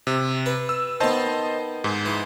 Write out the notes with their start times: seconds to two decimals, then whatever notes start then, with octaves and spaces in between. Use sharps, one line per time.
0.07 C3
0.46 B4
0.69 E6
1.00 D#3 B3 C5 D#5 A5
1.84 G#2 G#3
2.06 E3